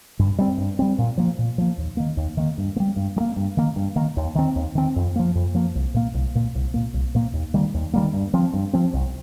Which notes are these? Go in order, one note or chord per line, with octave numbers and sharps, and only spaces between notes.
G2
G3 C4
G2
G3 C4
A#2
F3 A#3
A#2
F3 A#3
D#2
D#3 A#3
D#2
D#3 A#3
G2
A#3
G3
G2
G3
A#3
G2
D#3 A#3
G2
D#3 A#3
D#2
D#3 C4
D#2
D#3 C4
F2
F3 A#3
F2
F3 A#3
C2
A#2 A#3
C2
A#2 A#3
C2
A#2 A#3
C2
A#2 A#3
D#2
D#3 G3 A#3
D#2
D#3 G3 A#3
G2
F3 C4
G2
F3 C4
C2